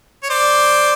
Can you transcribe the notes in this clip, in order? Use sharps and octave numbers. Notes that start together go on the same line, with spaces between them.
C#5
C5 D5